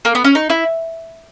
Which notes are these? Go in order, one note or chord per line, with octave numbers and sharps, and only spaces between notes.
A#3
B3
C#4
D#4
E4